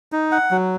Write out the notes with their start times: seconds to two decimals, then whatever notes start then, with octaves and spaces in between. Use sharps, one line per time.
0.12 D#4
0.32 F#5
0.51 F#3